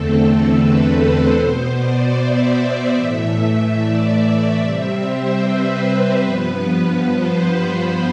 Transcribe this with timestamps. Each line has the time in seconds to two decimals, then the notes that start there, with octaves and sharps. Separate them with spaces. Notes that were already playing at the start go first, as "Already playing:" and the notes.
Already playing: E2 D3 A3 C4 A4
0.50 B4
0.90 C5
1.31 B2 B3 C5
1.72 D5
2.13 E5
2.94 A2 E3 A3
3.76 D5
4.58 C3 G3 C4 E5
4.99 C5
5.40 B4
6.22 G2 F3 B3 B4
7.03 C5